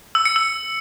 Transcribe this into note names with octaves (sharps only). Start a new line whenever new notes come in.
E6
C#7
E6